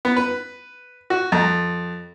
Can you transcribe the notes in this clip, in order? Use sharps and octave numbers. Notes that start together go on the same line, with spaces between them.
B3
B4
F#4
F2